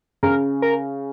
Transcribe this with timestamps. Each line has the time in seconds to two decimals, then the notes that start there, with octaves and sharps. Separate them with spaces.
0.23 C#3 A#4
0.62 A#4